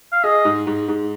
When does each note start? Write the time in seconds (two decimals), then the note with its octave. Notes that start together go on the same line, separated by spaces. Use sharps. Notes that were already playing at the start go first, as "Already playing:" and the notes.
0.12 F5
0.24 G#4 D#5
0.45 G#2
0.67 G#2
0.89 G#2